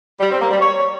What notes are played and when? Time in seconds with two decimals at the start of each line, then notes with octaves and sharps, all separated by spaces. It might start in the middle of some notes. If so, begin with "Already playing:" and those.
0.20 G3
0.31 C4
0.41 A#3
0.51 G3
0.61 C#5